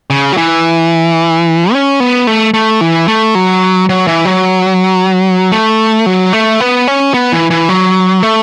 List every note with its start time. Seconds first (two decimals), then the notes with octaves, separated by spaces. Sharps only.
0.10 C#3
0.33 F#3
0.37 E3
1.73 C#4
2.00 B3
2.27 A3
2.54 A3
2.81 E3
3.08 A3
3.35 F#3
3.89 F#3
4.07 E3
4.25 F#3
5.52 A3
6.06 F#3
6.33 A3
6.60 B3
6.88 C#4
7.14 B3
7.32 E3
7.50 E3
7.69 F#3
8.23 A3